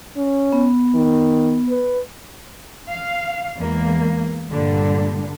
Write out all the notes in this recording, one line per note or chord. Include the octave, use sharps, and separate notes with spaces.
C#4
B3
D#3
B4
F5
E2 G#3 A#3
G2 A#2 D3 G3